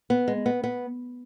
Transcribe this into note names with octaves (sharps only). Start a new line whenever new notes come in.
B3
G#3
B3
B3